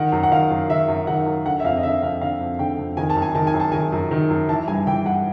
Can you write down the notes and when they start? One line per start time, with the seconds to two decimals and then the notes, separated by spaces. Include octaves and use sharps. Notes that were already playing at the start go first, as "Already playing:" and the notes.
Already playing: D#3 F#5
0.12 F#2
0.23 F#5
0.32 D#3 F5
0.51 F#2
0.70 D#3 E5
0.89 F#2
1.07 D#3 F#5
1.26 F#2
1.45 D3 F#5
1.60 E5
1.64 F2 F5
1.77 D#5
1.83 D3 E5
2.02 F2 F5
2.21 D3 F5
2.40 F2
2.59 D3 G5
2.78 F2
2.97 D#3 G#5
3.10 A5
3.16 F#2
3.22 G#5
3.35 D#3 A5
3.47 G#5
3.54 F#2
3.60 A5
3.72 D#3 G#5
3.92 F#2
4.11 D#3
4.30 F#2
4.49 E3 A5
4.68 G2 G#5
4.87 E3 G5
5.05 G2 F#5